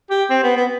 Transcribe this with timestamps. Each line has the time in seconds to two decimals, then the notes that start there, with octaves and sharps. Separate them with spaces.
0.10 G4
0.30 C4
0.43 B3
0.57 B3